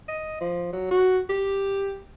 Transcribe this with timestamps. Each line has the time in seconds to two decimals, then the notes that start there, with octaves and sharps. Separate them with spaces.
0.08 D#5
0.41 F3
0.73 F#3
0.91 F#4
1.29 G4